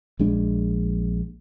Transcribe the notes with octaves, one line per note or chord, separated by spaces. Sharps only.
A#1 G#3 D4